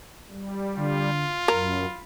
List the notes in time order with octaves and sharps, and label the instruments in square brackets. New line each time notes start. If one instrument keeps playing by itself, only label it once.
[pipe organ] G3
[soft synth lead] D3 [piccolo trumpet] F4
[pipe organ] F#2 [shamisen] A#4 [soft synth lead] B5